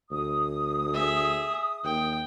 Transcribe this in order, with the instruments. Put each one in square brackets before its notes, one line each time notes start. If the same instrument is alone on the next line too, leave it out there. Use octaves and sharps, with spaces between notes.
[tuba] D2 [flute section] D#6
[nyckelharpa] G#4 E5
[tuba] D#2 [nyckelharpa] G5